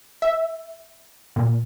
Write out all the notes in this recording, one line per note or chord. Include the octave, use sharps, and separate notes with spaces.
E5
A#2